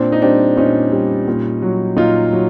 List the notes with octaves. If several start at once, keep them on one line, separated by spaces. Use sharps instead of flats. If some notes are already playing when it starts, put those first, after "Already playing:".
Already playing: A#2 C4 D4
D#4
G3 C4 D4
A#2 C#4 D#4
G3
A#2
F#3
A#2 D#4 F4
F#3